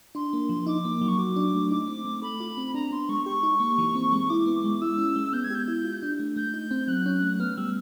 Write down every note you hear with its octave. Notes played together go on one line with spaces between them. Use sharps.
D4 C6
A#3
F3
D#4 D6
A#3
F#3
C#6
F#4 D6
D4
A3
D#4 D6
C4
A3
A4 B5
F4
C4
D4 A#5
B3 C6
G#3 C#6
G4 C#6
D#4
A#3
E3
C4
G#3
E4 D6
B3
G#3
E4 E6
C#4
G#3
B3 G6
G#6
G4 G6
E4
F4
D4
A3
A3 G6
D#4
C4
F#3 F#6
C#4
A3
B3 F6
G3 E6